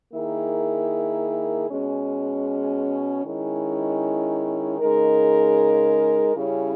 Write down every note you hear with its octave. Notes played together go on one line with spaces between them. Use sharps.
D#3 A#3 E4 G#4
B2 G#3 C#4
D#3 G#3 C#4 E4
C#3 G#3 D#4 A#4
C#3 G3 C#4 E4